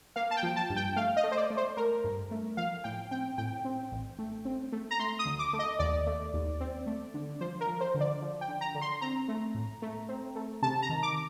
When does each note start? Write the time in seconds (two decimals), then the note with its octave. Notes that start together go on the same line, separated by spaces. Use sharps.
0.16 A#3 F5
0.31 A5
0.37 G5
0.43 F3
0.56 A5
0.70 G2
0.76 G5
0.96 A3 F5
1.17 D#5
1.23 A3
1.32 C5
1.37 D5
1.50 A3
1.57 C5
1.77 A3 A#4
2.04 G2
2.31 A3
2.57 F3 F5
2.84 A2 G5
3.11 C4 G5
3.38 A2 G5
3.65 C4
3.92 A1
4.19 A3
4.45 C4
4.72 A3
4.91 A#5
4.99 A3 C6
5.19 D#6
5.25 D2
5.39 D6
5.53 A3
5.59 D#5
5.79 D#2 D5
6.07 A3
6.34 D#2
6.60 C4
6.87 A3
7.14 D3
7.41 F3 C5
7.61 A#4
7.67 F3
7.81 C5
7.95 D3
8.01 D5
8.21 F3
8.41 G5
8.48 D3
8.61 A#5
8.75 D3
8.81 C6
9.01 C4 A#5
9.28 A3
9.55 A2
9.82 A3
10.09 C4
10.35 A3
10.62 C3 A5
10.82 A#5
10.89 D#3
11.03 D6